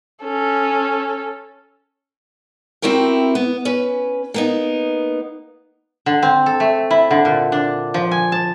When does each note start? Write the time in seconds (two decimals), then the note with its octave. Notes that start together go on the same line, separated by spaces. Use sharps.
0.24 C#4 A4
2.82 C4 E4 F#4 G4 A#4
3.35 B3
3.65 C#4 B4
4.34 A#3 B3 D#4
6.06 D3
6.22 C4
6.46 A4
6.60 A3
6.91 E4
7.11 D3
7.25 A#2
7.52 D4
7.94 F3
8.11 G#5
8.32 A5